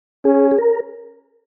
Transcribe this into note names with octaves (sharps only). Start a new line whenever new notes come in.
C#4 G#4
G#4
A#4